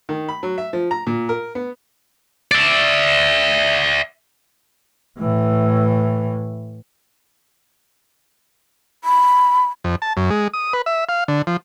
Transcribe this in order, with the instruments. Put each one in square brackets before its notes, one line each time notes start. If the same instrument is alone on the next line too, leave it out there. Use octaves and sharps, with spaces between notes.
[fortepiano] D#3
B5
F#3
E5
F3
A#5
A#2
A#4
B3
[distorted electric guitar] D5 E5
[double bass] A2 E3
[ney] B5
[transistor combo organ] F2
A5
F#2
G#3
D#6
B4
E5
F5
D3
F3